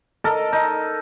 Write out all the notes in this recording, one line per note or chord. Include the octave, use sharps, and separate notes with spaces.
A4 A#4 D#5
D#4